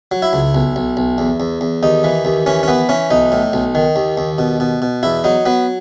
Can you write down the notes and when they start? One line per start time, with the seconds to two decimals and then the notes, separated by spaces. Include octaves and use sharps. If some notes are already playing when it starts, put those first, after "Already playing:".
0.11 F#3
0.22 E4
0.33 C#2
0.55 B1
0.76 B1
0.97 B1
1.18 E2
1.40 E2
1.61 E2
1.83 D#2 D#4
2.04 E3
2.25 D#2
2.46 E3 C#4
2.63 C#4
2.68 E3 B3
2.89 E3 C#4
3.10 B1 D#4
3.32 A2
3.53 B1
3.75 D#3
3.96 D#2
4.17 D#2
4.38 B2
4.60 B2
4.82 B2
5.03 E2 E4
5.24 F#3 D#4
5.46 F#3 B3